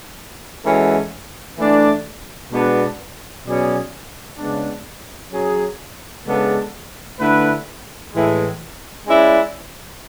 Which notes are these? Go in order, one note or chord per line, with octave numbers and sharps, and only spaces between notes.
E3 G#3 C#4 F#4 A4
E3 A3 D4
B2 G#3 B3 D4
B2 F#3 C#4 G#4 D5
C#3 G#3 B3 D4
F#3 C#4 G#4
C#3 G#3 B3 D4 A4
D3 A3 E4 B4
A2 E3 G#3
G#3 C#4 E4 B4 D5